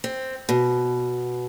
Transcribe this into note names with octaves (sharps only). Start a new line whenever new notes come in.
C4
B2